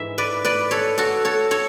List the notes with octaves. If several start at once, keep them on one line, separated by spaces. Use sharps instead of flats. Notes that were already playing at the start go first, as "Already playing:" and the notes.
Already playing: G#2 E3 E5
B4 D5
B4 D5
A4 C#5
F#4 A4
A4 C#5
A4 C#5